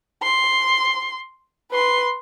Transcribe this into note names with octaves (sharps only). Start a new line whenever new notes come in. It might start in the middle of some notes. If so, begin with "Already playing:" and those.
C6
B4 C6